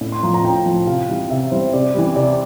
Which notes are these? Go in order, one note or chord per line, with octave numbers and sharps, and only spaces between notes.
A2
C6
F3 A#5
A#5
A2 G5
F3 A5
C3 F5
E3 G3
C3 E5
E3 G3 C5
C3 D5
E3 G3
C3 D5